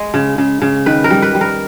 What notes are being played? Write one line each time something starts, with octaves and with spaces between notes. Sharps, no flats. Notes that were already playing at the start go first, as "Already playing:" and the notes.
Already playing: G#3
C#3
C#3
C#3
D#3 B4
A#4
G3
B4
G3
A#4